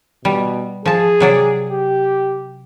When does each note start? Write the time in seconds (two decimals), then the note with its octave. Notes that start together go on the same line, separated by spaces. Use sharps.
0.25 B2 G3
0.86 F3 G#4 A5
1.20 C3 F#3 D5
1.70 G4